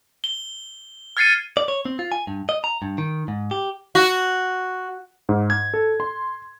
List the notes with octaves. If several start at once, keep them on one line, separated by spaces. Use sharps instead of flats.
G7
F6 G#6 A6 C7 C#7 D#7
D5
C#5
C4
F4
G#5
G2
D#5
A#5
G2
D#3
G#2
G4
F#4
G#2
G#6
A4
C6